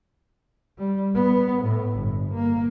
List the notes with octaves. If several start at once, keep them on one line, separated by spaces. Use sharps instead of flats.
G3
B3
A2
G1
A#3